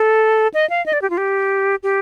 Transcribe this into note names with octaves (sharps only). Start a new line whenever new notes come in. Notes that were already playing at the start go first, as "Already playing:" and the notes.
Already playing: A4
D#5
F5
D#5
D5
G4
F4
G4
G4